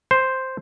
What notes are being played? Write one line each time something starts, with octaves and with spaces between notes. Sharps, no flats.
C5